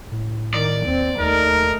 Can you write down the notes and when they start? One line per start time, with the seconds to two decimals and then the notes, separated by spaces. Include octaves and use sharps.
0.12 A2
0.54 D#3 D5
0.86 D#2 C4
1.20 D#2 A3 D#4 A#4